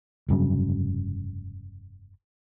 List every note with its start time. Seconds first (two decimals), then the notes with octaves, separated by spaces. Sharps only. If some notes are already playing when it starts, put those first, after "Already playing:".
0.28 F1 G2 C#3 F#3